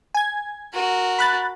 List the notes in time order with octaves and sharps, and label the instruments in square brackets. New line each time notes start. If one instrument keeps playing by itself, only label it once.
[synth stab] G#5 G#6
[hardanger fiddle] F#4 A#4
[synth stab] B5 F#6 A6